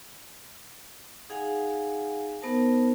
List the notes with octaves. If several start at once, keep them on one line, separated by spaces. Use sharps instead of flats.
D#4 G#4 F5 F#5 G#5
B3 D#4 A#4 C5 A5